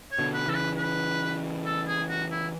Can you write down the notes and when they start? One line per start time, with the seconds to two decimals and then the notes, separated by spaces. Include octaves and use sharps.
0.12 C#5
0.19 B2 D3
0.34 B4
0.48 C#3 E3 A4
0.55 B4
0.77 B4
1.66 A4
1.87 G#4
2.09 F#4
2.31 E4